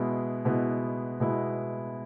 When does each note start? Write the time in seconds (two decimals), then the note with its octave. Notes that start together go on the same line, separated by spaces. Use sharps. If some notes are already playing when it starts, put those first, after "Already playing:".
Already playing: B2 G#3 B3 E4
0.45 B2 G#3 B3 E4
1.20 B2 G#3 B3 E4